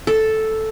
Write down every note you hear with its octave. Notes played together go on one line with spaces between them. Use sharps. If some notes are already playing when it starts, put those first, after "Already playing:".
A4